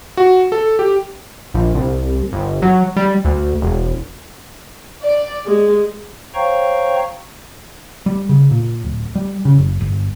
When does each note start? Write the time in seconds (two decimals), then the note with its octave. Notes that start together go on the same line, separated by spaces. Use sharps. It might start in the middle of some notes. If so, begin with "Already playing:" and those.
0.17 F#4
0.52 A4
0.79 G4
1.54 A#1
1.75 C2
2.32 G1
2.62 F#3
2.97 G3
3.25 D2
3.62 E1
5.02 D5
5.46 G#3
6.35 C5 C#5 F5 G5 A#5 C#6
8.06 G3
8.29 C#3
8.51 A#2
8.84 D1
9.15 G3
9.45 C#3
9.58 F#1
9.81 G1